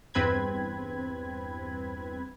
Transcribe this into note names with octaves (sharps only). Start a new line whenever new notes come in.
E2 G2 C4 B4 B5 G#6